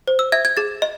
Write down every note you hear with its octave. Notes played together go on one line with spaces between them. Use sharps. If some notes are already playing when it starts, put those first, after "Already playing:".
C5
E6
E5 G#6
G#6
G#4 A6
D#5